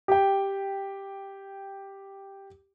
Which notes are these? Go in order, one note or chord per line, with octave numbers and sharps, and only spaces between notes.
G4 G5